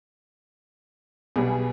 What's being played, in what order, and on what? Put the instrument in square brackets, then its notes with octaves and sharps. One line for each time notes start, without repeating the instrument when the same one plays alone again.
[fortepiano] B1 [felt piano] B2 [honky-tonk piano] G3 G#4